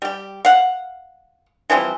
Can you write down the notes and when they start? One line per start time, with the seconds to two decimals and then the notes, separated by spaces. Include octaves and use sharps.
0.02 G3 G4
0.45 F5 F#5
1.70 E3 F3 G3 C4